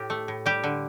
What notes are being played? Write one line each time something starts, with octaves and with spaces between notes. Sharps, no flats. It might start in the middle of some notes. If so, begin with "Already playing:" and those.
Already playing: A2 G4
A3
A2
G3 G4
D3